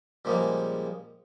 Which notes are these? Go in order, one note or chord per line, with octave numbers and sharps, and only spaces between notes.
A#2 C#3 F3 G3 G#3 A#3